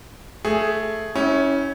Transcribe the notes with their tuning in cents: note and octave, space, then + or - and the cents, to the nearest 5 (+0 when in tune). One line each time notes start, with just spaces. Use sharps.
A3 +0 G#4 +5
C#4 +0 E4 -30 G4 -30